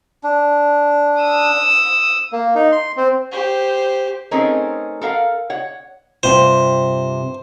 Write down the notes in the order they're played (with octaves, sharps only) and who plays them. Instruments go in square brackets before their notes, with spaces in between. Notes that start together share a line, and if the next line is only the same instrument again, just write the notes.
[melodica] D4
[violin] D#6 E6
[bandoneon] A#3
D#4
C6
C4
[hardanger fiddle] G4 C5
[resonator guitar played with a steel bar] A3 C4 C#4 D#4 G#4 A#4
A4 A#4 F5 F#5
C#5 F#5
[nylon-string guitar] G2 C3 F4 [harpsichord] C5